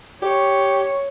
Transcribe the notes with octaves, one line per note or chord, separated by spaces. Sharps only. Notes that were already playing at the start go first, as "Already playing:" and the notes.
G4 C#5